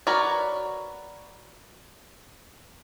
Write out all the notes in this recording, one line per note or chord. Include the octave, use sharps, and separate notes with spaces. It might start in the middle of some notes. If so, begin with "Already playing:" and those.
F#4 A#4 B4 C#5 D5